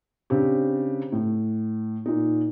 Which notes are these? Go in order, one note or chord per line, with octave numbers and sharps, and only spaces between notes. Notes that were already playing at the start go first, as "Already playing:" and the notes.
C#3 C4 D4 G4
A2
A#2 D#4